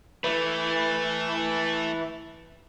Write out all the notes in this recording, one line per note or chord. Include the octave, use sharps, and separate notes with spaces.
E3 A3 B4